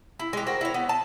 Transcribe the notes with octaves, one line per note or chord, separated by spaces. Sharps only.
E4
G#3 G4
F#4 A#4 C5 G5
E4 C#5
B3
A5